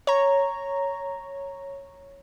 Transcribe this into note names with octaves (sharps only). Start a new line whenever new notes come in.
C#5 A#5